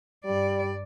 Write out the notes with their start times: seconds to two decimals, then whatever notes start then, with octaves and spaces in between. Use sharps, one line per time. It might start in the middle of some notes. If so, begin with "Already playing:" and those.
0.25 G2 G3 D5